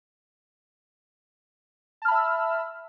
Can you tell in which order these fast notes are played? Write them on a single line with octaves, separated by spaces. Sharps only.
A5 F6 B5 E5 E6